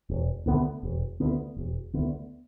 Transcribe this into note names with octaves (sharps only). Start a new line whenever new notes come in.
E1
D2 D3 B3
E1
D2 D3 B3
E1
D2 D3 B3